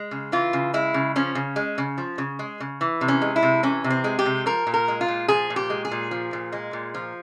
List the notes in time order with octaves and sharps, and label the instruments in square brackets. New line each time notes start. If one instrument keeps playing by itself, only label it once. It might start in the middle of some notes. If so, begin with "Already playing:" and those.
Already playing: [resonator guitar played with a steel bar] G#3
C#3
E3 F4
C#3
G#3 E4
C#3
F3 C#4
C#3
G#3
C#3
F3
C#3
G#3
C#3
E3
C3
C#4
G#3
E4
C3
E3 C#4
C3
C4
G#3
G4
C3
F3 A#4
A#2
A#4
G#3
F4
A#2
F3 G#4
A#2
G4
G#3
G#4
A#2
F3
A#2
G#3
A#2
F3